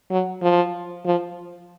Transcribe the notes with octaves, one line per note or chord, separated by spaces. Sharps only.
F#3
F3
F3